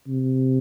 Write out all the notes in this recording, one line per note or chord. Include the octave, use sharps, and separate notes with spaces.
C3